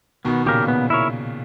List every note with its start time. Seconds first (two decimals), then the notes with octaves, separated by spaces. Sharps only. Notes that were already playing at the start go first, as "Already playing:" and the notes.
0.25 B2 D#3 B3
0.46 A#2 C#3 G4 A#4
0.68 B3
0.90 E4 A#4 C#5